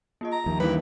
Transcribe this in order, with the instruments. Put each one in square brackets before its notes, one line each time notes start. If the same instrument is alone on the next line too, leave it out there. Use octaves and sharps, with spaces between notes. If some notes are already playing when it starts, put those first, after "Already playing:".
[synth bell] A#3 F4 D#5
[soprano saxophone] A#5
[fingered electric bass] D#2 [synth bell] F3
[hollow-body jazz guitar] G2 E3 [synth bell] A#3 [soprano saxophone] B4